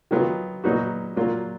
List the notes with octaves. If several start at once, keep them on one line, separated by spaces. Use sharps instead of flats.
D#3 F#3 B3 F4
A#2 F#3 B3 D#4 F#4
A#2 F#3 A#3 F4